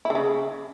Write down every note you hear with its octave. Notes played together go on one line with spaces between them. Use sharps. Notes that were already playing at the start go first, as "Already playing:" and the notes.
E4
D3
C#3